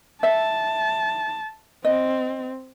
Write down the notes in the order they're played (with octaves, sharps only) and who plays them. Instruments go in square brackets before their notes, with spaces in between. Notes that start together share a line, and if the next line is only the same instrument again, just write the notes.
[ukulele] E5 [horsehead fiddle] A5
[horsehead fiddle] C4 [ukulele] D#5